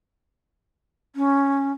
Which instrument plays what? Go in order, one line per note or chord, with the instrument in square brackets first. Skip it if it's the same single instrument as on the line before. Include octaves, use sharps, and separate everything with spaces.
[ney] C#4